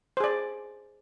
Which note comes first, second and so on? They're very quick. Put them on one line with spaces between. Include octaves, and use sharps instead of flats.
C5 G#4 D5